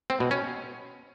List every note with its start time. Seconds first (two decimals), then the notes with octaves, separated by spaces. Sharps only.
0.10 C4
0.20 B2
0.31 C#4